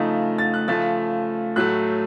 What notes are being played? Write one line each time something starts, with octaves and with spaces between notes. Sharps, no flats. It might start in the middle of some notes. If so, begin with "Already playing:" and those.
Already playing: C#3 F3 A3 D#4
A6
F#6
C#3 F3 A3 A6
A2 F#3 A3 F#6